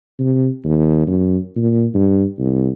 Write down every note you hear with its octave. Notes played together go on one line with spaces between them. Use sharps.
C3
D#2
F#2
A#2
G2
C2